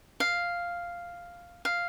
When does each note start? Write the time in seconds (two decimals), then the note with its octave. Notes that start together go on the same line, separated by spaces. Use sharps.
0.20 F5
1.65 F5